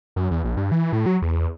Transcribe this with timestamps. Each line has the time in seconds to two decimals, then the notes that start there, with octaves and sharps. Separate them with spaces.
0.16 F#2
0.31 E2
0.44 A#1
0.57 G2
0.72 E3
0.93 A2
1.06 F#3
1.22 E2